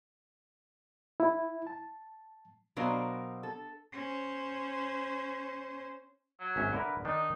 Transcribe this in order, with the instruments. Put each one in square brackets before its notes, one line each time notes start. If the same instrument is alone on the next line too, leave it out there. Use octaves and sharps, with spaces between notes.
[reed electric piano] E4
A5
[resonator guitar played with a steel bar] B2 F#3 D4 A#4 C5 F5
A4
[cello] C#4 C5
[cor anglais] F#3
[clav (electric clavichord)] G#1 C#4 E5
[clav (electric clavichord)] D3 E4 A#4 [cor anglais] B4
[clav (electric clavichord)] D#3 D4 [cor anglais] D#4